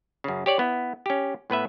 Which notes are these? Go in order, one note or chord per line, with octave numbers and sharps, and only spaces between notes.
F#2 C#3
G4 C#5 D5
B3 E4
C#4 G4
A2 B3 B4 E5